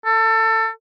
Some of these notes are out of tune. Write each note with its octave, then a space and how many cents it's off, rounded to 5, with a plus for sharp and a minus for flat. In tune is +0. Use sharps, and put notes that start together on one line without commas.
A4 +25